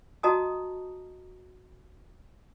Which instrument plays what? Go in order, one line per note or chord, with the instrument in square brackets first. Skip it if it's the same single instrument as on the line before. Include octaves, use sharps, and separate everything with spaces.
[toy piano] F#4 D#5 A5 A#5 D#6